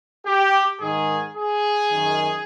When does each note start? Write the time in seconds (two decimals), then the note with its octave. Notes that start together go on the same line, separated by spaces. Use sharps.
0.26 G4
0.81 G#2 D#3 G#4
1.36 G#4
1.91 F#2 D#3